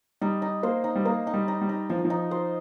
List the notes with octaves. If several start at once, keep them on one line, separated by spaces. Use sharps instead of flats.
G3 D#4
D#4
A#3 C5
D#4
G3
A#3 D#4
D#4
G3
D#4
G3
D#4
F3 D#4
D#3
F3
D#4
C5